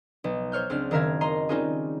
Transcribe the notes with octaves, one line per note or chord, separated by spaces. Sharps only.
B1
C5 C#5 F6 G6
C#2 C4 D4 F6
F#1 D#3 A#4 E5 F5 G#6
D#5 A#5 C6 C7
G3 C4 C#4 D#4 F4 G#4